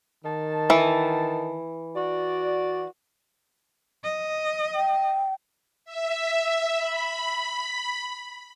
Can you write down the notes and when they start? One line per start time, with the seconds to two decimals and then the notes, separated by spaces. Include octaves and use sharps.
0.24 D#3 A5
0.70 E3
1.95 F#4 D5
4.04 D#5
4.75 G5
5.85 E5
6.77 B5